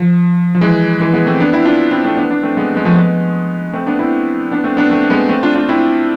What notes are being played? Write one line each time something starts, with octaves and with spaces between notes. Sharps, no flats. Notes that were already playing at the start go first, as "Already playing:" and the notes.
Already playing: F3
F3
E3 G#3
E3 G#3
G#3 B3
A3 C4
B3 D4
C4 E4
D4 F4
C4 E4
A3 C4
B3 D4
B3 D4
A3 C4
G#3 B3
G#3 B3
F3 A3
G#3 B3
A3 C4
B3 D4
C4 E4
B3 D4
A3 C4
B3 D4
A3 C4
C4
G#3 B3
A3 C4
D4 F4
D4 F4
C4 E4